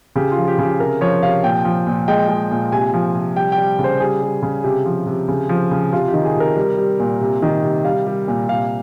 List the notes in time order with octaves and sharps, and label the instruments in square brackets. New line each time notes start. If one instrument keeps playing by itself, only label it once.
[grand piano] C#3 G4
F4
F3
G4
C#3 G4
C3 A#4
F3 C#5
C3 F5
A#2 G5
F3
A#2
G#3 G5
G#3
A#2
C3 G#5
F3
C3
G3 G5
G5
G3
C#3
C5
G3 G#4
G3
C#3
C3 G4
F3
C3
C#3
F3
C#3
C3 F4
G4
D#3
G#4
C3
A#4
G3
G3
A#2
C3
D#3
C3
G3 F5
G3
A#2
C3 F5